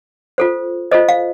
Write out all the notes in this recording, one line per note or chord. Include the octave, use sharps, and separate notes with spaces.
F4 A4 C5
F4 A4 C5 D#5
F5